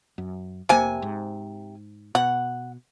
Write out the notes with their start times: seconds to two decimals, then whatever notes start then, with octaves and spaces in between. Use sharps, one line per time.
0.18 F#2
0.69 F1 C3 A#3 G#5
1.02 G#2
2.15 B2 F#5